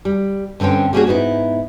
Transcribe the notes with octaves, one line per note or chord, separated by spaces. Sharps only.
G3
G2 D3 C4 C#4 G5
G3 A#3 C#4 E4 F#4 G#4
G#2 B3 D#4 E4